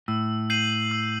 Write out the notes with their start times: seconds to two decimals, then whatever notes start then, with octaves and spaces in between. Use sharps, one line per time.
0.08 A2 E6
0.50 G6 C7 D#7 F#7
0.91 E6